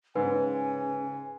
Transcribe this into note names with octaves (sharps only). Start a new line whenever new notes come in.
G#2 C#3 B4 G#5